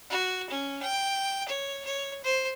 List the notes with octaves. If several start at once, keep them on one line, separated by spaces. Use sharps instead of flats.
F#4
C#4
G5
C#5
C#5
C5